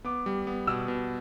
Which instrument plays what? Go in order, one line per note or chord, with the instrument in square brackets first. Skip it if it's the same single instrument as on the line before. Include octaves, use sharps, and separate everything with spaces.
[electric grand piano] B3 [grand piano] D6
[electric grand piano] G3
B3
[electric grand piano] B2 [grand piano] E6
[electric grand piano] B2